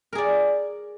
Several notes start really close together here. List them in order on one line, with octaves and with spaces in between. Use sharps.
A#4 G#4 D5